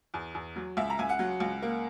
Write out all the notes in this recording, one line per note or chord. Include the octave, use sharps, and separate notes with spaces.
E2
E2
F#3
C#2 E5
A#5
C#2 G#5
F#5
F#3
C#2
A#3